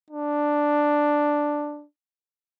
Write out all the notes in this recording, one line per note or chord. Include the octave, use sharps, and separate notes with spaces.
D4